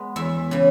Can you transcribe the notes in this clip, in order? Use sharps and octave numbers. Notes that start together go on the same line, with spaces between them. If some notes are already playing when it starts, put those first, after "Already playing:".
Already playing: G#3 B3
E2 E5
C#3 E3